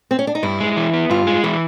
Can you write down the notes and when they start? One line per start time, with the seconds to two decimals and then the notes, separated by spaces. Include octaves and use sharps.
0.11 C4
0.19 C#4
0.27 D4
0.35 D#4
0.43 G2 E4
0.60 G#3
0.77 E3
0.94 B3
1.10 G2 F4
1.27 G#3
1.44 E3 E4